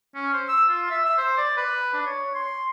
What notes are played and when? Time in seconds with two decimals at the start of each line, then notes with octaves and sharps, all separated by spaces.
0.15 C#4
0.33 C5
0.48 E6
0.69 F4
0.90 E5
1.06 E6
1.18 C5
1.38 D5
1.57 B4
1.93 D4
2.06 C#5
2.35 C6